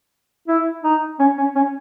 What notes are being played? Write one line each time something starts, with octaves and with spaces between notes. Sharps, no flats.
E4
D#4
C#4
C#4
C#4